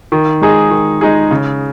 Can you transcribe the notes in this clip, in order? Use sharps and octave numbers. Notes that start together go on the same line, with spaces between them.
D#3
G#3 D#4 G#4
D#3
G#3 D#4 G#4
C#3